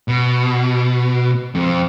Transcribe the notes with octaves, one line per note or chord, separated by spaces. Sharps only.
B2
F2